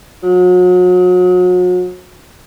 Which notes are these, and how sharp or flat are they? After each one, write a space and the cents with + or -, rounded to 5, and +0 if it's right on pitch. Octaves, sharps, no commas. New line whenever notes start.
F#3 -40